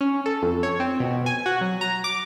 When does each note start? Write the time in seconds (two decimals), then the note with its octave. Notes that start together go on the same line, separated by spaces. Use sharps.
0.01 C#4
0.26 A4
0.42 F2
0.63 C#5
0.80 C4
1.00 B2
1.26 G#5
1.46 F#4
1.61 F#3
1.81 A#5
2.04 D6